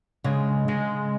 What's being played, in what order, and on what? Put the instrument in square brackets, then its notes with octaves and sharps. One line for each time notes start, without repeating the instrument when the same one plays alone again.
[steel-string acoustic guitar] C#3 [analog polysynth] G#3
[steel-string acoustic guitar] C#3 [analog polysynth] G#3